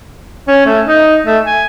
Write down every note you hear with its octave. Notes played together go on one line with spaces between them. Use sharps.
C#4
A3
D#4
A3
G#5